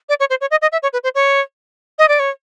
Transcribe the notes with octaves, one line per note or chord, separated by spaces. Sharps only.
D5
C#5
C5
C#5
D#5
D#5
E5
C#5
B4
C5
C#5
D#5
D5
C#5